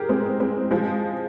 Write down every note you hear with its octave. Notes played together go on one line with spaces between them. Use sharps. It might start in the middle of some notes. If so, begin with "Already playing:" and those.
Already playing: G4 G#4 A#4
G#3 C4
G#3 C4
F3 G#3